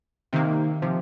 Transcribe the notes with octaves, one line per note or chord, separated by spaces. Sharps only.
C3 D#3 A#3
C3 F3